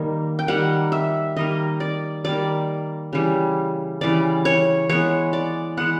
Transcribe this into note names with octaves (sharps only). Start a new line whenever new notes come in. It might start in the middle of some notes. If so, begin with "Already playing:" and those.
Already playing: D#3 G3 A#3
G5
D#3 G3 A#3 F#5
E5
D#3 G3 A#3 D#5
D5
D#3 G3 A#3 D5
C#3 E3 G3
C#3 E3 G3 D5
C#5
E3 G#3 B3 C#5
D5
E3 G#3 B3 F#5